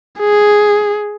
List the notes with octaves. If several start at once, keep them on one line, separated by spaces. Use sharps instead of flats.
G#4